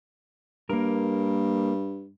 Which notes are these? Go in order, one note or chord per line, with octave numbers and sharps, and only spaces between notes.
G2 A#3 A#4